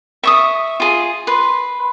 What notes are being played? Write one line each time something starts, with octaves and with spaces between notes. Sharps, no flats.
E5 C#6 D#6
F4 G#4
B4 C6